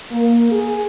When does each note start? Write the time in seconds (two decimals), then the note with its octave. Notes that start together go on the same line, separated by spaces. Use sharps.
0.12 A#3
0.52 G#4